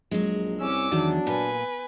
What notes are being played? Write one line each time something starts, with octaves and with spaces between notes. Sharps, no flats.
A#1 F#3 G#3
C2 C#4 D6 E6
E2 D#3 F#3 D4
A#2 B4 G#5